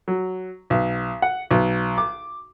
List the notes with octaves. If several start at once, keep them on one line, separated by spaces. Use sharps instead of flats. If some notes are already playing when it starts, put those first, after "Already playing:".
F#3
B1
F#5
B1
D6